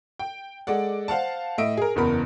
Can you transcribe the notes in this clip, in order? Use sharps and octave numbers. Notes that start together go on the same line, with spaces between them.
G5
G#3 A4 D5 F#5
C5 F5 F#5 A5
A2 D#5 E5 D7
G#4 A#4
F#1 E2 B3 A#4 B5